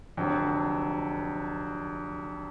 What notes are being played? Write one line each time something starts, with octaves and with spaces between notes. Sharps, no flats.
F1 F2 D3 F#3